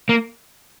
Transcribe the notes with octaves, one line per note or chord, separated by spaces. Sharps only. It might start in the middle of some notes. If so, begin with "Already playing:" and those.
A#3